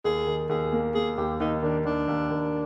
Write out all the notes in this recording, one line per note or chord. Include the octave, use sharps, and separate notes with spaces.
D#2 G#4
D#3
D#2 G#4
A#3
A#3 G#4
D#2 G4
D#2 D#4
D#3 D4
D#2 D4
D#2
D#2